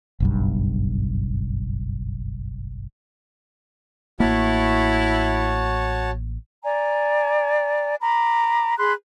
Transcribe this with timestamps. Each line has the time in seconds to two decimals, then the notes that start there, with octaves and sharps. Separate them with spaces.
0.20 F#1 B1 G2
4.20 A1 A#3 E4 F#4 C#5 A5
6.63 D5 G#5 A#5
8.00 A#5 B5 D6
8.78 G#4 B5 C6 F#6